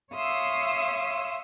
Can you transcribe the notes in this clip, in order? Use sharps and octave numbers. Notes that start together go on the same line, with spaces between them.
C#5 E5 F5 C6 D#6 E6